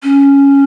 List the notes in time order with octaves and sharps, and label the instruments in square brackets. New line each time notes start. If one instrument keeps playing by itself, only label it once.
[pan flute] C#4